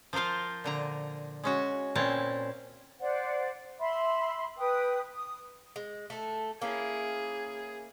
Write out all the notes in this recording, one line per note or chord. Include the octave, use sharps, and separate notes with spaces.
F3 F4 A#4 C5 F5
A#2 D3 A#5
G#3 C#4 F#4
A#2 C4 C#4 E4 A5 A#5
C5 D5 F#5
E5 B5 C6
B4 G5 D#6
D#6
G#3
A3 A4
A#3 C#4 E4 G#4